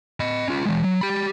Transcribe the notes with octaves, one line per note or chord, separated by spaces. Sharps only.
D#5 B5
C#4 F4
E3 G#3
F#3
G4 B5